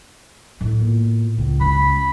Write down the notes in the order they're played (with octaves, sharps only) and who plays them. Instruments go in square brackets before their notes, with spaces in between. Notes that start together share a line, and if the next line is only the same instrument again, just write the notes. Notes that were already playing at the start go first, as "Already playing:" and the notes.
[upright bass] A2 B3
[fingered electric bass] A#2
C#2
[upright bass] C#4 [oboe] B5